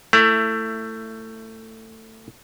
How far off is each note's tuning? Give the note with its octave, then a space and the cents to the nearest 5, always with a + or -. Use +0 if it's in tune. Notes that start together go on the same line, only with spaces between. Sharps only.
A3 +20 E4 +15